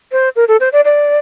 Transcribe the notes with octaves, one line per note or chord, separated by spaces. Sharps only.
C5
A#4
A4
C5
D5
D5